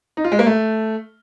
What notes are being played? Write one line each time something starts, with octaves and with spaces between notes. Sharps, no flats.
D#4
F4
G#3
A#3
A3